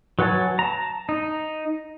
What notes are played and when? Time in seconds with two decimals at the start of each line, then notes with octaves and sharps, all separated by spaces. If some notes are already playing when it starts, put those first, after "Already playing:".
0.19 F#3 B4 F#5 G#5 A5
0.59 A5 A#5
1.09 D#4